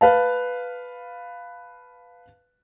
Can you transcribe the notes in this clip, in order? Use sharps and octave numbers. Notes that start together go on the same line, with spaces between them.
B4 F5 A5